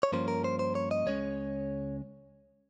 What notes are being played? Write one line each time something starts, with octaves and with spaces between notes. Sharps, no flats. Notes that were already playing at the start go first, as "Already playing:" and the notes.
C#5
G2 F3 A#3 C#4 C5
A#4
C5
C5
C#5
D#5
C#2 C#3 G#3 C#4 C#5